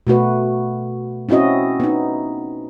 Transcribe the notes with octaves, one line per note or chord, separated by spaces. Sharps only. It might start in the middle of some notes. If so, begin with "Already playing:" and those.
B2 A3 F#4 B4
C4 C#4 E4 F#4 D#5
B3 D#4